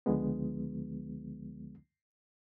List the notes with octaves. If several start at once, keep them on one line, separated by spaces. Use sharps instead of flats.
C#2 D3 F3 G#3 B3